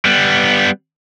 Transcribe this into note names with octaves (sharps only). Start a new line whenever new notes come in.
G3 B3